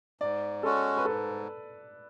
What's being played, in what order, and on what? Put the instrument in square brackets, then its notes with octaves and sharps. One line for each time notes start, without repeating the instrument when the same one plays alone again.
[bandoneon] G#2 [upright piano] D5
[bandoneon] G#3 C#4 F#4 [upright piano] A4
[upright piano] B4
[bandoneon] G#2 [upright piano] A4